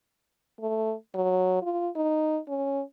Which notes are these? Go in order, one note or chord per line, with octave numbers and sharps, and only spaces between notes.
A3
F#3
F4
D#4
C#4